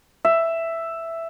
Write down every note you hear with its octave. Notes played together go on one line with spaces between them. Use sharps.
E5